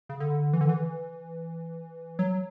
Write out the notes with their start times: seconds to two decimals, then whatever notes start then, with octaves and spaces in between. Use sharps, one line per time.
0.09 C#3
0.20 D3
0.53 E3
0.61 D3
0.69 E3
2.19 F#3